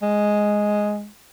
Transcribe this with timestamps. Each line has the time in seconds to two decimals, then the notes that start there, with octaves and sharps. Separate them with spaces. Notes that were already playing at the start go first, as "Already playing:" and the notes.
0.02 G#3